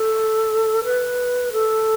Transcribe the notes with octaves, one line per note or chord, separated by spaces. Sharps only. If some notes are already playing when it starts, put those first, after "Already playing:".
Already playing: A4
B4
A4